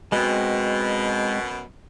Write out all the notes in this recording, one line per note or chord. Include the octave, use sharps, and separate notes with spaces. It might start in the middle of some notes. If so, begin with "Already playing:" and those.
F#2 B2 G#3 C4